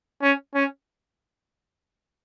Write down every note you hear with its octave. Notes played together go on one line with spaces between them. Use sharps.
C#4
C#4